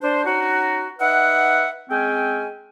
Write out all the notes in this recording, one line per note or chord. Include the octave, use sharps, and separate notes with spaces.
D4 C5
C#4 D#4 F#4
D#4 B4 E5 F#5
G#3 C4 C#4 G5 G#5